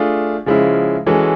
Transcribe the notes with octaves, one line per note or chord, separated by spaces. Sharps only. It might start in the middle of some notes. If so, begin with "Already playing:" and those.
Already playing: A3 D4 F4 G#4
C#3 F3 G#3 C#4 E4
E3 G#3 C#4 F#4 A4